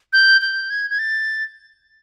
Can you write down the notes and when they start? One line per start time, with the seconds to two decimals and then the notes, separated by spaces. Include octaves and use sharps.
0.13 G6
0.41 G6
0.70 G#6
0.90 G#6
0.99 A6